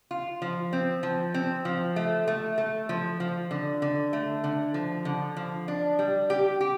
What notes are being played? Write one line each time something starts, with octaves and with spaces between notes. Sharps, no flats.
F4
F3
C4
F3
C4
F3
A3
A3
A3
F3
F3
D3
D3
A3
D3
F3
D3
F3
D4
G3
G4
G4